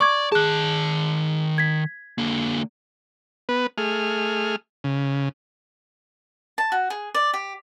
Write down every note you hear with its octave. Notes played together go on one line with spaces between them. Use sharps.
D5 C#6 D6 G#6
D#3 G#4 A5 F#6
G#6 B6
D3 A#3
B3 B4
A3 G#4 F6
C#3
A5
F#4
G#4
D5
G4